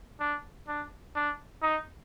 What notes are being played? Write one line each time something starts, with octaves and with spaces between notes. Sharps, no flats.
D4
D4
D4
D#4